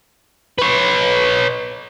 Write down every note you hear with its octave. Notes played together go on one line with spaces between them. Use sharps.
B4 C#5